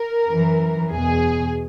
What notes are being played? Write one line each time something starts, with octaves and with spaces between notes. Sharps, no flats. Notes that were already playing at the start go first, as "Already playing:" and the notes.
Already playing: A#4
F#2 E3
E2 B2 G#4